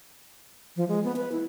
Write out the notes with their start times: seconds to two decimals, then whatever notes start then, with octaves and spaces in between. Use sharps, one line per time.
0.76 F3
0.88 G#3
1.04 B3
1.16 B4
1.32 E4